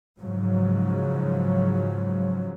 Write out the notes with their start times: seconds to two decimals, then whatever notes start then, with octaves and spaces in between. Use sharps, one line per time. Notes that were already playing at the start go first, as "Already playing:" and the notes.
0.20 G#2 C#3 F3 F#3